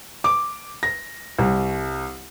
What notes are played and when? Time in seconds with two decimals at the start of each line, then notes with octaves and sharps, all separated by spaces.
0.24 D6
0.83 A#6
1.39 C2